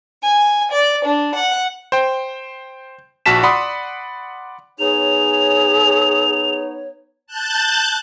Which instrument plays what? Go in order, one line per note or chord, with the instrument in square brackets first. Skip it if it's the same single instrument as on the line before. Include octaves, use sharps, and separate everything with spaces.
[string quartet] G#5
D5
D4
F#5
[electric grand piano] C5 G5
A#1 F#4 A5 B6 E7
D5 F#5 B5 C6 D#6
[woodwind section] B3 D#4 C#5 [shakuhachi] G#4 [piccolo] F7
[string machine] A5 F#6 G6 A6